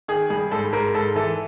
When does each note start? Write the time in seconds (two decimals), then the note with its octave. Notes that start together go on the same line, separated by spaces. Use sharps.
0.08 D#3 G#4
0.30 G2 G#4
0.51 G#2 A4
0.73 G#2 A#4
0.94 G#2 A4
1.15 E3 A4